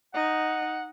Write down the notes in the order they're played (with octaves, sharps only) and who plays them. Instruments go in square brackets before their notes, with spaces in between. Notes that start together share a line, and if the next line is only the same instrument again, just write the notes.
[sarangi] D#4 [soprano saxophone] F#5